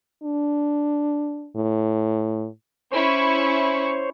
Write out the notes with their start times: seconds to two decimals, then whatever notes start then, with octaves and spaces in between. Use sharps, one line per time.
0.24 D4
1.56 A2
2.92 C#4 E4 C5 C#5 C#6